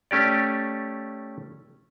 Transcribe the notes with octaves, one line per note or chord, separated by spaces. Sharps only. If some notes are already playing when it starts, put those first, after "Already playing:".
A3 C#4 G4 D5